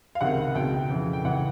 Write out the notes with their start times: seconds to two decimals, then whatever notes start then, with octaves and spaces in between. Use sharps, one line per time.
0.15 F5
0.21 C#2 C3 D#3 F#5
0.55 C#2 B2 G5
0.90 F2 C#3 E3
1.13 G5
1.25 C#2 C#3 E3 F#5